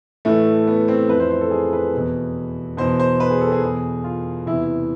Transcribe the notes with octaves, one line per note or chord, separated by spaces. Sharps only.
A2 E3 A3
B3
C4
F2 E3 B4
C5
C5
A4
G#4
B4
E2 B2
E2 B2 C5
C5
B4
G#4
A4
G#4
E2 B2 G#4
F4
E2 C3 E3 E4